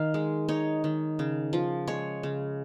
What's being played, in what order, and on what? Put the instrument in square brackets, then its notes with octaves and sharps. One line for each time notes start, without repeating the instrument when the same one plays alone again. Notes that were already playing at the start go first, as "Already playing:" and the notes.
Already playing: [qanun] D#3 F5
G#3
D#4 C#5
D#3
C#3
F3
G#3 C#5
C#3